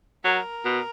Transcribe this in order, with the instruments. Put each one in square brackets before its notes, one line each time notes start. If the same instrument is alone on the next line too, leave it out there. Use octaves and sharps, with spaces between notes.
[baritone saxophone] F#3 [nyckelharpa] A#4
[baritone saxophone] B2